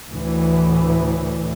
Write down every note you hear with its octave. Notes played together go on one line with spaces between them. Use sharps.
D2 A2 E3